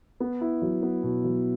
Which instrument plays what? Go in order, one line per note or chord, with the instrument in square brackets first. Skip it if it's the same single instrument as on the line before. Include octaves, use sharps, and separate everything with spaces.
[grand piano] B3
E4
F#3
B3
B2
F#3